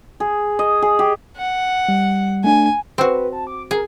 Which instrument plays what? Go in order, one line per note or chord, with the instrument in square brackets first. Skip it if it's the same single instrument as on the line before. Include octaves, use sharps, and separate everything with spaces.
[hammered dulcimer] G#4
D#5
G#4
G4
[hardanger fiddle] F#5
[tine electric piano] G3
[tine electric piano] A3 D4 [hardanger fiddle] G#5
[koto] C4 F#4 [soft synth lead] B4
[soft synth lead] A5
D6
[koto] G#4 [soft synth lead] A#4